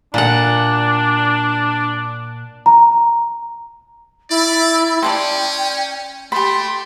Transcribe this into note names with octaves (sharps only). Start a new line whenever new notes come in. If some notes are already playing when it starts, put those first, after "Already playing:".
A#2 D4 F#5
A#5
E4 D5
C#4 D5 G5 A5 C6
A3 G4 B5 C6